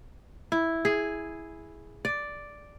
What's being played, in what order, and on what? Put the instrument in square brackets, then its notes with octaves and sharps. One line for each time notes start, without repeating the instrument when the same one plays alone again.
[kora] E4
G#4
D5